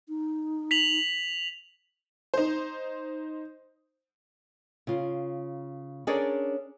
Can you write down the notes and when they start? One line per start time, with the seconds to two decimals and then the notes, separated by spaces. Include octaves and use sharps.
0.09 D#4
0.71 B6 F7 F#7
2.34 D#4 C5
4.87 C#3 F4
6.07 C#4 D4 G#4 A#4 C#5 D5